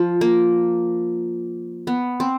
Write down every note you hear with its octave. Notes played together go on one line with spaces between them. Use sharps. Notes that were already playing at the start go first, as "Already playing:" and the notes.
Already playing: F3
A#3
B3
C4